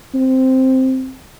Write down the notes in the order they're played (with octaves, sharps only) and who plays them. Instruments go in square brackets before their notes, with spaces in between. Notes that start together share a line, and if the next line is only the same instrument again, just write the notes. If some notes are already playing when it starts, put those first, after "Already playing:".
[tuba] C4